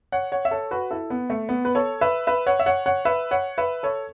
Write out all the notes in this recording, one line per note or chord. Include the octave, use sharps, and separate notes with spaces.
C#5 F#5
C#5 F#5
E5
A4 C#5
F#4 B4
E4 A4
B3
A3
B3
B4
A4 C#5
B4 E5
B4 E5
C#5 F#5
E5
C#5 F#5
C#5 F#5
B4 E5
C#5 F#5
B4 E5
A4 C#5